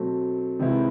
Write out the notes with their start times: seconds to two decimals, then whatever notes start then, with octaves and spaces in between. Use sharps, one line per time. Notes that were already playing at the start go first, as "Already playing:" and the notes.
Already playing: B2 F#3 A3 C4
0.59 C3 D#3 G#3 B3 E4